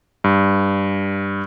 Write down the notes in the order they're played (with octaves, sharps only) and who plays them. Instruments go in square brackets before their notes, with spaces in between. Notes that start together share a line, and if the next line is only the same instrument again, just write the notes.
[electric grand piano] G2